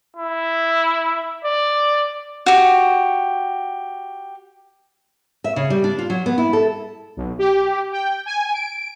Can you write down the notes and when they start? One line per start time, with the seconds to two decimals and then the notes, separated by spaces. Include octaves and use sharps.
0.16 E4
1.45 D5
2.46 F#4 G4
5.44 E5
5.56 C#3
5.70 G3
5.84 D4
5.98 F4
6.10 F#3
6.26 B3
6.38 E4
6.53 A4
7.17 B1
7.39 G4
7.92 G5
8.26 G#5
8.54 D7